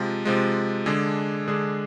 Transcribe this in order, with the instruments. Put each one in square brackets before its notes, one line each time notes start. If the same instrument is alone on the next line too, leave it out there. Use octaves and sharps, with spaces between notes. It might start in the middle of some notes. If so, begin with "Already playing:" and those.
Already playing: [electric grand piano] C3 F3 G#3
C3 F3 G#3
D3 G#3 D4 G#4
D3 G#3 D4 G#4